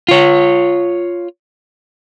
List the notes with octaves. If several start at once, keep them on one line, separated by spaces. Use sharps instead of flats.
F4 C#5